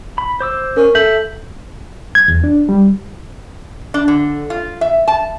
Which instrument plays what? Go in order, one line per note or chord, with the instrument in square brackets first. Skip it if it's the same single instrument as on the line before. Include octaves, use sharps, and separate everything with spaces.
[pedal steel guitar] B5
C5 D6 E6
[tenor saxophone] C#4 [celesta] A#4
[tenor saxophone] A4 [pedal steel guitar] E5 [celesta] G6 F#7
[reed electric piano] G#6
E2
D4
G3
[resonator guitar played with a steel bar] D4
D3
F4
E5
A5